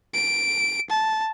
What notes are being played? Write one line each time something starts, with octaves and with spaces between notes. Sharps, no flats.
D7
A5